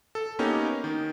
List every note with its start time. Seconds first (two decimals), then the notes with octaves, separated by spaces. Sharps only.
0.15 A4
0.39 A#3 B3 C#4 D#4 G4
0.84 D#3